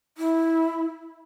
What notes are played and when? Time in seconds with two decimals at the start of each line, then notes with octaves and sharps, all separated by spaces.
0.18 E4